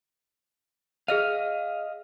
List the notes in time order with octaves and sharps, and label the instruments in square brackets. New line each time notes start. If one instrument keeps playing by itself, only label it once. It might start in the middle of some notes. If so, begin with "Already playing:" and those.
[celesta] G#4 F6 D#7 [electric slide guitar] D#5 F5